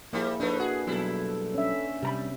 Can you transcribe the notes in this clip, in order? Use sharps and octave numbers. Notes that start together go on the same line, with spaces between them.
F3 G3 A#3 E4 G#4
F3 A3 D4 D#4 B4
F#4 G#4
B2 F#3 G3 E4 A4
C#4 D4 E5
C3 G3 A#5 B5